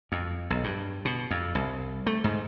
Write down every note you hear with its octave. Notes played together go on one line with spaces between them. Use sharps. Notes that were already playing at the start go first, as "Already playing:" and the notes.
F2
B1
G2
B2
F2
C2
A3
G#2